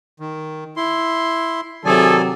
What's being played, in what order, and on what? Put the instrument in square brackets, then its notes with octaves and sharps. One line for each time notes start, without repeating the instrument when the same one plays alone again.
[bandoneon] D#3
E4 C6
[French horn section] C3 F#3 [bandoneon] D#3 D5 G#5 [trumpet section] G#4 A4